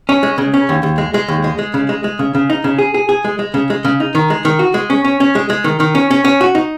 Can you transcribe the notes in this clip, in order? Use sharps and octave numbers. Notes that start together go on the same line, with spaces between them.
C#4
G#3
C#3
C#4
D#2
D#2
G#3
G#3
D#2
G#3
G#3
C#3
G#3
G#3
C#3
C#3
D#4
C#3
G#4
G#4
G#4
G#3
G#3
C#3
G#3
C#3
D#4
D#3
G#3
D#3
F#4
G#3
C#4
C#4
C#4
G#3
G#3
D#3
D#3
C#4
C#4
C#4
F#4
D#4